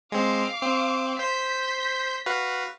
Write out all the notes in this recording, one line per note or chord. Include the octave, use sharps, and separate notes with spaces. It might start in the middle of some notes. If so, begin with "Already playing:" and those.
G#3 C4 F5 D6
C4
C5 G6 B6
F#4 B4 F5